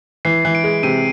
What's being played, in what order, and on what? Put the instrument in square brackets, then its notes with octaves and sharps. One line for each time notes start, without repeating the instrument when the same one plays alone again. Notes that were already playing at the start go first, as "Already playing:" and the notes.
[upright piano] E3 [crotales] C7
[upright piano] E3
[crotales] D7
[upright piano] G#3
[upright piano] C3 [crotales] D#7